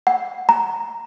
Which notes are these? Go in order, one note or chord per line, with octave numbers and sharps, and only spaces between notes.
F#5
A#5